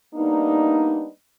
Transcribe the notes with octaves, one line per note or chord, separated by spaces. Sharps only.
G3 A#3 B3 D4 D#4